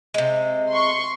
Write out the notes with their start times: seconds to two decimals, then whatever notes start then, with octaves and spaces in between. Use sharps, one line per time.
0.14 C3 G#3
0.70 C6 C#6